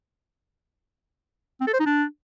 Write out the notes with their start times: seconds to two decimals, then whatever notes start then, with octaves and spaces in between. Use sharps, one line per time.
1.61 C4
1.67 A4
1.74 C5
1.80 D#4
1.86 D4